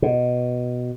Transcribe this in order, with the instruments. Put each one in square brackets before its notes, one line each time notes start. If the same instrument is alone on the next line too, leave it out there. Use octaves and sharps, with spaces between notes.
[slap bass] B2